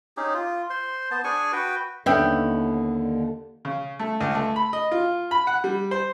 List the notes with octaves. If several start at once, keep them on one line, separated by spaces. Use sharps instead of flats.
C#4 D#4 G4 G#4
F4
C5 C6
B3 C5 A5
D4 G#4 G#5 C#6
F#4 B4 G5
D#2 D3 B3 C#4 D4 E5 G5
C#3
A3
C#2
A3
B5
D#5
F4
B5
F#5
G3
C5